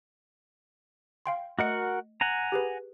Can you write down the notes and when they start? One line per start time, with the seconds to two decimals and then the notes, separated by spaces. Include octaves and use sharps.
1.26 F5 G5 C6
1.59 A3 F#4 A#4 D#5 F#5 C#7
2.21 F#5 G#5 A#5
2.52 G4 G#4 B4